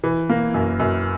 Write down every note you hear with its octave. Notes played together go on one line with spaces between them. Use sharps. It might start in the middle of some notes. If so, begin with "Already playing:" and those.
E3
A#3
F#2
F#2